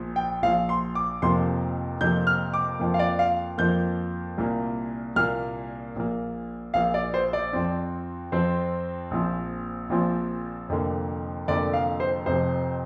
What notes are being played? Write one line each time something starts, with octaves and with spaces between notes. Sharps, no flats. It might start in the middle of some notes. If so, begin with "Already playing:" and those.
Already playing: A#1 A#2 F3
G5
A#1 A#2 F3 F5
C6
D6
F1 F2 C3 F3 A#3 C6
F1 F2 C3 F3 A#3 G6
F6
D6
F2 F3 A#3
F5
D5
F5
F2 F3 A#3 G6
C2 A#2 A#3
C2 A#2 A#3 F6
A#1 A#2 A#3
A#1 A#2 A#3 F5
D5
C5
D5
F2 F3 C4
F2 F3 C4 C5
A#1 A#2 F3 C4
A#1 A#2 F3 C4
F1 F2 D3 A#3
F1 F2 D3 A#3 D5
F5
C5
F1 F2 C3 C5